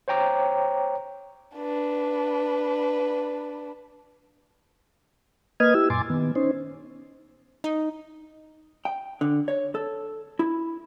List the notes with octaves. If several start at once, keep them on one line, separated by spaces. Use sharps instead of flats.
C5 C#5 G5 A#5 D6
D4 B4
A#3 B4 D#5 D#6 F6 G#6
E4 G4 E6
F#2 A#2 G#5 C6 D6 A6
D#3 B3
C#4 D#4 C5
D#4
G5
D3
C#5
A4
E4